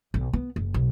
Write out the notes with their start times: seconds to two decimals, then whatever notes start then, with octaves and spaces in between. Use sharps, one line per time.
0.14 B1
0.33 B3
0.56 F#1
0.74 B1